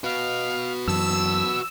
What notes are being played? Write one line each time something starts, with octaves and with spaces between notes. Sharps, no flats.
F#4 B4 F5
F#2 E3 A5 E6